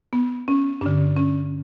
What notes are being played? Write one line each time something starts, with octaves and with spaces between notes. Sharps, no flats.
B3
C#4
G2 D3 D4
C#4